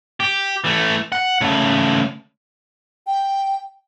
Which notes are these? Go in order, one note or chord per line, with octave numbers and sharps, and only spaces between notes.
G4
E3 A3
F#5
C#3 A3
G5